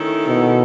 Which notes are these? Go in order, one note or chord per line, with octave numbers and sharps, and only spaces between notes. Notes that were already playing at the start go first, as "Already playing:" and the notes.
Already playing: D#3 A3 C#4 E4 A4
B2